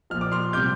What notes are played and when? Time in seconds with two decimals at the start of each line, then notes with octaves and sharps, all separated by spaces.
0.10 A#2 F3 F6
0.21 D6
0.32 C6 F6
0.53 C3 G3 D6 G6